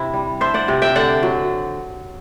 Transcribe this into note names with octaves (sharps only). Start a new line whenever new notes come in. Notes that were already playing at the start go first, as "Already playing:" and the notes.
Already playing: C3 D4 E4
G3
D4 C5 E5
D5 F#5
C3
E5 G5
D3 D5 F#5
F#3